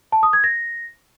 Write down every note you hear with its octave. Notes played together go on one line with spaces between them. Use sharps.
A5
D#6
G#6
A#6